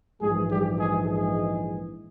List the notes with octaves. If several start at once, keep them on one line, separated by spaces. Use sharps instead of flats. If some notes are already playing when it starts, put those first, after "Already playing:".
A#1 G#2 E3 G#3 G#4
G3 G4
G#3 G#4
G#3 G#4